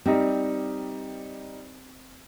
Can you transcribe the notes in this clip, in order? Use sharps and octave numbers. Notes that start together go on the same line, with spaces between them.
G3 C4 D#4 G4